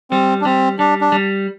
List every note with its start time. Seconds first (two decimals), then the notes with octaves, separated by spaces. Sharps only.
0.11 G3 C4
0.41 D4
0.45 G3 C4
0.79 G3 D4
1.01 D4
1.12 G3